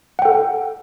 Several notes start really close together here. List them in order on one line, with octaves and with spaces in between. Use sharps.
F#5 G5 A4